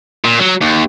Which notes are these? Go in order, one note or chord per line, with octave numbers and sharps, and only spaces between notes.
A#2
F#3
D#2